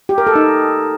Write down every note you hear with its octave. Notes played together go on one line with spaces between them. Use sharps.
G4
A#4
A4
D#4